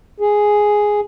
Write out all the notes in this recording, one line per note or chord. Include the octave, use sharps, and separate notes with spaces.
G#4